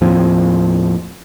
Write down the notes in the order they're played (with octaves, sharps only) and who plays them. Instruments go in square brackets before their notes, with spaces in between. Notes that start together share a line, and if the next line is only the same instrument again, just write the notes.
[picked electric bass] D#2 A2 F3 C4